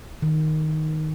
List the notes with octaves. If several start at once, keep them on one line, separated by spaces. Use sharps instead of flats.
D#3